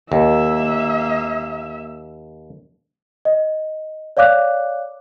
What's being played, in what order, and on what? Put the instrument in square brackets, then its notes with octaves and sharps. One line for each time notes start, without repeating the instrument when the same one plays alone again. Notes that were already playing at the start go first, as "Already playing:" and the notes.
[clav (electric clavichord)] D#2 [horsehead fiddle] A#3 E5
[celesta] D#5
C#5 D5 F5 D6 F#6